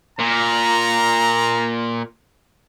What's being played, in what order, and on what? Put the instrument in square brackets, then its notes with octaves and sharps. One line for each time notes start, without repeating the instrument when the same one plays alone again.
[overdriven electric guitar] A#2 [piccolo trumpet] A#5